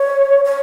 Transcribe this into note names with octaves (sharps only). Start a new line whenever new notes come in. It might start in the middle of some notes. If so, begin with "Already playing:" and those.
Already playing: C#5
C#5